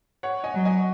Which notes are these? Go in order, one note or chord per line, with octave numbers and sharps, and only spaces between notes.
C#5 F#5
D#5 G#5
F#3
D#5 G#5